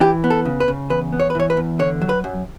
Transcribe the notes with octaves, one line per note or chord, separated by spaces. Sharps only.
E3 G4
B3
A4
C#3
B4
C#3
E2 B4
B3
C#5
B4
E3 C#5
B4
E2
D3 C#5
F#3
B4
F#2